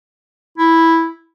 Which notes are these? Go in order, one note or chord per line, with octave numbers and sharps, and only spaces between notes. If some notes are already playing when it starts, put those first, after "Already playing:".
E4